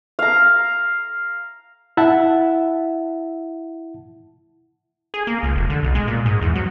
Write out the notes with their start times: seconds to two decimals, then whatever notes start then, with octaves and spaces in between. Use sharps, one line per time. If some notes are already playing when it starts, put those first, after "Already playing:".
0.19 F5 A#5
1.97 E4 E5 F#5 A5
5.14 G#4
5.27 A#3
5.43 C#2
5.56 F1
5.70 D3
5.83 B1
5.95 G#3
6.07 A#2
6.26 G#2
6.41 E2
6.55 F#3